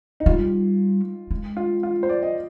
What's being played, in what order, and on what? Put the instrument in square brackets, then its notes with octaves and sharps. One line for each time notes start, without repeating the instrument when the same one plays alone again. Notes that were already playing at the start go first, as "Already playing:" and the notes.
[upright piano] D#4
[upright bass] G3 [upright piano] F4
[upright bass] G#3
[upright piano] F4
F4
C5
D5
D#5